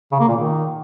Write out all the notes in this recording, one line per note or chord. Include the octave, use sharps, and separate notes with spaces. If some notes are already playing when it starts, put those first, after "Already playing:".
C#3
A#3
A#2
D#3